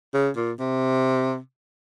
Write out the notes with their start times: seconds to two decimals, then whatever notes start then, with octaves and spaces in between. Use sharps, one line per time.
0.14 C#3
0.36 A#2
0.59 C3